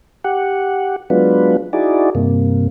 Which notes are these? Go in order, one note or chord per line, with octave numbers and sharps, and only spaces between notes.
G4 F#5
F#3 G#3 B3 D4 F4 B4
D#4 E4 F#4 G#4 D5
G2 C3 A#3